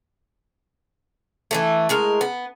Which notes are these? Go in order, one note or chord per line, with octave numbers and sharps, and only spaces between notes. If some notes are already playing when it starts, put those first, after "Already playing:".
E3 F3 A3
A2 G#3 A#4
B3